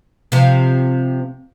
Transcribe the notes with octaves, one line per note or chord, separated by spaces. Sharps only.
C3 F3